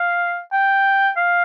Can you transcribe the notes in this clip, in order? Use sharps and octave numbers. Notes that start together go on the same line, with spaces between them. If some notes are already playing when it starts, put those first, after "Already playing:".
Already playing: F5
G5
F5